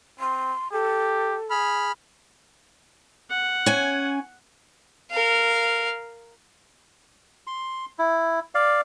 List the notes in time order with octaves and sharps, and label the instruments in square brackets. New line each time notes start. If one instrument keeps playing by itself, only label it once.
[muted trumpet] C4 [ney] C6
[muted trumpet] G4 [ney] A4
[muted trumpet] G#4 [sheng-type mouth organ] B5 F6
[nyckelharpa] F#5
[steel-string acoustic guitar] C#4 G#5
[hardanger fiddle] A#4 F5
[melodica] C6
E4
D5 F5